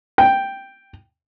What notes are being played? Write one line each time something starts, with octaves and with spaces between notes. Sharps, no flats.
G5